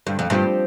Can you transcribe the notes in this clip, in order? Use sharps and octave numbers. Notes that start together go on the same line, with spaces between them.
G2 D3
F2
G2 F3 C4 G4